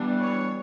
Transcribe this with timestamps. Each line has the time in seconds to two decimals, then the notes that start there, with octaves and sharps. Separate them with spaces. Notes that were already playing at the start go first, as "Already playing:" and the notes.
Already playing: E3 G3 B3 D4
0.21 C#5